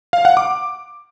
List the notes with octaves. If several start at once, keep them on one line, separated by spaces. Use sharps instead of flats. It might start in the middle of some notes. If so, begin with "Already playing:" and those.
F5
F#5
D6